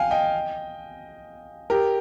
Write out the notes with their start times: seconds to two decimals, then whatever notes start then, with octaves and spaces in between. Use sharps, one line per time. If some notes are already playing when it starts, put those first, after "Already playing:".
Already playing: F5 G5 G#5
0.11 D#5 G5
1.70 G4 A#4